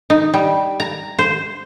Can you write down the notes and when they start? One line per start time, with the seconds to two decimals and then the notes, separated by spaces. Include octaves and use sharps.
0.10 D#4
0.34 G3
0.80 A#5
1.19 C5